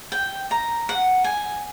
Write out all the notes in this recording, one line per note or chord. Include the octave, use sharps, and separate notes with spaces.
G5
A#5
F#5
G#5